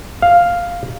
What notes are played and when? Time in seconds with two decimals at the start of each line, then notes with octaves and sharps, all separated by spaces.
0.22 F5